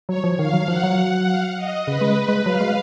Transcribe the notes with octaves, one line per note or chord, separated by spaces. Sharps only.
F#3 C#5
F3
D#3 F5
F#3
F3 F#5
F#3
F5
D#5
C#3 B4
G#3
G#3
F#3 F5
G#3